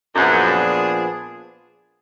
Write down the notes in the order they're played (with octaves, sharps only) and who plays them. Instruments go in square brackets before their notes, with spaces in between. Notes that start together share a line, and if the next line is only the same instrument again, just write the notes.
[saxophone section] F#2 [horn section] A#2 F3 B3 D4 G#4